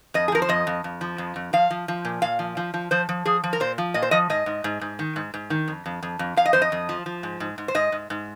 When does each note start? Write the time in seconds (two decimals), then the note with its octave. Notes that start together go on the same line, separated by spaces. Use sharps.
0.14 F2 D#5
0.28 G#4
0.32 F3 A#4
0.42 C5
0.49 F2 D#5
0.67 F2
0.84 F2
1.01 F3
1.18 F2
1.36 F2
1.53 F3 F5
1.70 F3
1.88 F3
2.05 A#2
2.22 A#2 F5
2.39 F3
2.57 F3
2.74 F3
2.91 F3 C5
3.09 F3
3.25 F3 G#4
3.44 F3
3.53 A#4
3.60 A#2 C5
3.78 F3
3.94 A#2 D#5
4.02 C5
4.11 F3 D#5
4.30 G#2 D#5
4.46 G#2
4.64 G#2
4.81 G#2
4.99 D#3
5.16 G#2
5.34 G#2
5.50 D#3
5.68 F2
5.86 F2
6.03 F2
6.19 F2
6.36 F2 F5
6.45 D#5
6.53 F2 C5
6.62 D#5
6.72 F2
6.89 F3
7.06 F3
7.23 G#2
7.40 G#2
7.58 G#2
7.68 C5
7.75 G#2 D#5
7.92 G#2
8.10 G#2